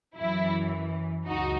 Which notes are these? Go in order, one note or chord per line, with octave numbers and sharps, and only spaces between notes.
F#2 E3 E4
C#2 D#4 F#4